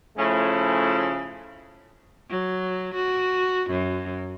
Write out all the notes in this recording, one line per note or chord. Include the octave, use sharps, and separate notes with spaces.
C#3 F3 A3 C#4 E4
F#3
F#4
F#2